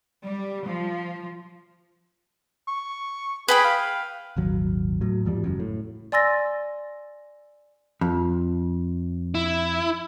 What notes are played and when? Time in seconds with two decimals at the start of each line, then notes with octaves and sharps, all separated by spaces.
0.25 G3
0.67 F3
2.68 C#6
3.48 G#4 B4 G5 B5
3.64 F5
4.36 D#1 G#1 F#3
5.01 A2 F#3
5.25 E2 G#2 F3 G3
5.44 F#1 F#2
5.60 A2
6.12 D5 G#5 C6 E6 A6 A#6
8.01 F2
9.35 E4